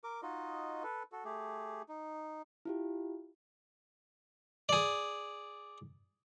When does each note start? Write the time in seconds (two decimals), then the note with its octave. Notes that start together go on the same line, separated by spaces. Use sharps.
0.04 A#4 D6
0.23 D#4 F4 F#4 D#5
0.83 A4 B4
1.12 F#4 A4
1.25 A3 G4 G#4
1.89 D#4
2.65 E4 F4 G4
4.69 G#4 D5